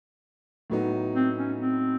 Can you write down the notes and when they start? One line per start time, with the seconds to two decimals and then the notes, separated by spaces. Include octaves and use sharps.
0.70 A2 F#3 B3 D#4
1.16 C4
1.38 C#4
1.61 C4